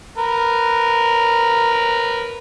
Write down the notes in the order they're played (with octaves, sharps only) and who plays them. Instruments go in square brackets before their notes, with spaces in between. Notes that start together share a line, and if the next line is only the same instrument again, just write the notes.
[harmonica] A#4 B4